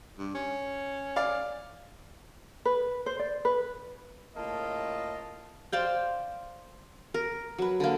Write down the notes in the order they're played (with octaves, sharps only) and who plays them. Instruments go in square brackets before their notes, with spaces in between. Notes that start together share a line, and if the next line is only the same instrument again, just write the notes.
[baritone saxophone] G2
C#4
[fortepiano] D5 F5
[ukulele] B4
C5
D5
B4
[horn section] A2 C#3 A#3 F4 D#5 A5
[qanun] C5 D5 F5 G5
A#4
F#3 B4
D3 A#3